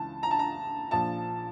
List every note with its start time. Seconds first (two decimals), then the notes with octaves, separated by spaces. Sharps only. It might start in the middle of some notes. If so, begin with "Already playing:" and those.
Already playing: C#2 C#3 E3 A5
0.23 A#5
0.31 A5
0.39 A#5
0.91 A#1 A#2 F3 A5